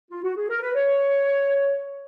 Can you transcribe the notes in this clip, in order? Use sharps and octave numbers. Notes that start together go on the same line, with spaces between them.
F4
F#4
G#4
A#4
B4
C#5